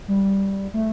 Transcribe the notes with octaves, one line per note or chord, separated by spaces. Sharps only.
G3
A3